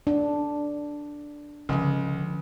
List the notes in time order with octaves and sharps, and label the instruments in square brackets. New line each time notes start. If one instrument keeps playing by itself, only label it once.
[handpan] D4
[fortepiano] C#2 [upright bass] D3 F3